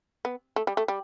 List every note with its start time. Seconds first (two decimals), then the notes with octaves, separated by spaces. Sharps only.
0.25 B3
0.56 A3
0.67 G3
0.77 A3
0.88 G3